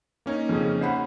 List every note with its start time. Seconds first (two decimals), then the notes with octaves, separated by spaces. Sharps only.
0.26 A#3 C#4 D#4
0.49 F2 C#3
0.81 C5 F#5 B5